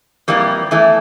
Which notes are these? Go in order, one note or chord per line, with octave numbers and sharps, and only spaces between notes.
F2 E3 G3 A#3
E2 E3 A3